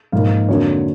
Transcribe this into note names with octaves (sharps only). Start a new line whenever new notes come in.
G#2 F3 A#3 F5
F2 D3 F#3 A#3 C#5